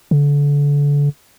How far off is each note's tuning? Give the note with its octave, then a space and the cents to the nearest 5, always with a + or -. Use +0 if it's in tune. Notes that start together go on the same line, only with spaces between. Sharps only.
D3 -30